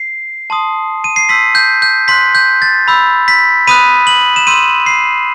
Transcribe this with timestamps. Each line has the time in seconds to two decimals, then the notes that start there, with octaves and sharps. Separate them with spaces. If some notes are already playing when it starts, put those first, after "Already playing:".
Already playing: C7
0.50 A5 C6 D#6
1.04 D#7
1.16 C7
1.29 C6 E6 G6 B6
1.55 G6
1.82 G6
2.08 C6 F#6 B6
2.35 G6
2.62 A6
2.88 B5 E6 G6
3.28 B6
3.67 B5 D#6 F#6 D#7
4.07 F#7
4.36 E7
4.47 C6 E6 G6 D#7
4.86 C7